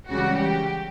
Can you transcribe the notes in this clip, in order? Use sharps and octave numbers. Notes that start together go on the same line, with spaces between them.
C#2 C#3 E3 G3 F#4
G4